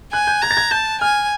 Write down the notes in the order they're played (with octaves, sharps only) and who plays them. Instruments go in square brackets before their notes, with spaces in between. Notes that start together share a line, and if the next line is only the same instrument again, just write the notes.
[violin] G#5 [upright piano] F#6
[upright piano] G6
[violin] A#5 [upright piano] G#6
[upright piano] A6
G#6
[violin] A5 [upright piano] G6
[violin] G#5 [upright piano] F6